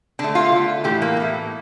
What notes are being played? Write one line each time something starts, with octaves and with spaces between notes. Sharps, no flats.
D3 A3 D4
F4
D3 A3
A2 E3 A3 G4
A#3
A2 E3 A3